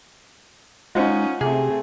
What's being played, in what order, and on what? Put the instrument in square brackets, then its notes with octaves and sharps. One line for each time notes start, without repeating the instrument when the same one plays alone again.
[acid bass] G#3 [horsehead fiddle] C#4 D#4 [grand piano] F4 C5 F#5
[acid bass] C3 [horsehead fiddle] A3 C4 [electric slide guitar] G#4